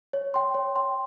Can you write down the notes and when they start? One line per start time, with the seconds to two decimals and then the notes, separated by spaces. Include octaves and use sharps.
0.13 C#5
0.34 G5 C6
0.54 C#5
0.76 G5 C6